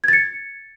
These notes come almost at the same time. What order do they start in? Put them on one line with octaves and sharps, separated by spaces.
G#6 A6 C#7